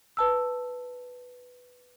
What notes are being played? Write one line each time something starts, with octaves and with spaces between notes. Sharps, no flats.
B4 A5 E6